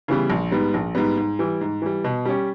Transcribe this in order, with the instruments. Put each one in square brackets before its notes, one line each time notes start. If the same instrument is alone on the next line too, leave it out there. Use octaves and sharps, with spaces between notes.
[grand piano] C#3 E3 G3 B3
A#1
G#2 G3 B3
A#1
G#2 G3 B3
G#2
E3 G3
G#2
E3 G3
B2
G3 C#4 G4